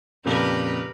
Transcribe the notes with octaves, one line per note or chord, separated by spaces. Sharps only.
F2 A#2 C#3 G4 A#4 B4